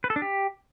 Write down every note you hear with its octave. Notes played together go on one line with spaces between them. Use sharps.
B4
A4
D4
G4